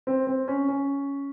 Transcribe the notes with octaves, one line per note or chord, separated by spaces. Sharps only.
C4
C4
C#4
C#4